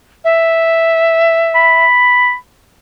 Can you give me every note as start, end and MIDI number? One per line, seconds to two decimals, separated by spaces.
0.24 1.85 76
1.55 2.34 83